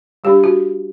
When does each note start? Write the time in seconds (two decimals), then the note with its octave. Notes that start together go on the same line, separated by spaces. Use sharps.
0.24 G3 D4 G4
0.44 F#4